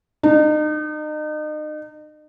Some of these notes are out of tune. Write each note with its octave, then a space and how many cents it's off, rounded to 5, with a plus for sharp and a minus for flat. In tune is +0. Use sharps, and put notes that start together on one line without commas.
D#4 -35